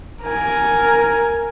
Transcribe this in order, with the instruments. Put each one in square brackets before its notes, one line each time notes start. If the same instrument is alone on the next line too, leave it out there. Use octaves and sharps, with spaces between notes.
[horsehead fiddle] A#4 G#5